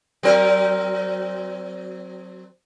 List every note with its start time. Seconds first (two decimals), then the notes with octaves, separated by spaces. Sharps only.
0.23 F#3 C4 A#4